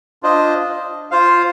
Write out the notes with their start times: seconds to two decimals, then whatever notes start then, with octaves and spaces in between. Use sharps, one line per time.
0.23 D4 F4 C5 D#5
1.11 F4 C5 F5